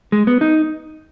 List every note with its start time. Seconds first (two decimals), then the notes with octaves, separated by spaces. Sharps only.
0.12 G#3
0.27 B3
0.41 D#4